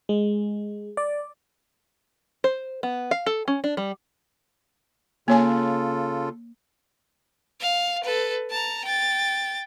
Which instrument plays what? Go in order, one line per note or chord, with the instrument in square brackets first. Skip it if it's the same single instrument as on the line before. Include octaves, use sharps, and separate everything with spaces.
[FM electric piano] G#3
D5
[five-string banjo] C5
B3
F5
A4
C#4
D4
G3
[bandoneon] C#3 F4 A4 [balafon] A#3 C#5 G#5
[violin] F5
A4 B4
A5 A#5
G5 A6